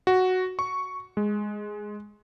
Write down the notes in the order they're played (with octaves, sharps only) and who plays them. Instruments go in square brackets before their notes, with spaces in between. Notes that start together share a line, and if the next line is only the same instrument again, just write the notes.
[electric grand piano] F#4
C#6
G#3